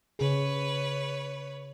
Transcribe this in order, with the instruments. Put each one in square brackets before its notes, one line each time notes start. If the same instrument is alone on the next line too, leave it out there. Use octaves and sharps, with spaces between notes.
[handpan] C#3 G#4 [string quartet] B4 C#5